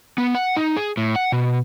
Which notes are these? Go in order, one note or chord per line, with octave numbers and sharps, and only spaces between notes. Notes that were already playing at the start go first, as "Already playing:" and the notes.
B3
F#5
D#4
G#4
A2
F#5
B2